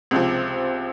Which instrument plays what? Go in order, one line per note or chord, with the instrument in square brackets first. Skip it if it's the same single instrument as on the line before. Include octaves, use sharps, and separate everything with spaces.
[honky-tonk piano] C#2 C3 F3 C4